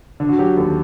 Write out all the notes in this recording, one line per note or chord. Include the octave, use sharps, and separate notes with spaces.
D3
F#4
F#3 G4
D#2 A4